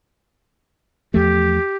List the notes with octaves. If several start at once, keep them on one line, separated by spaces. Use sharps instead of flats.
E2 F3 A3 G4